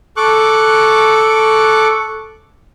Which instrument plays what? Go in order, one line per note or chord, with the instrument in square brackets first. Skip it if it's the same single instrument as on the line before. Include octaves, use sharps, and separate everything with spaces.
[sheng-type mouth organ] A4 C#6 D6 F#6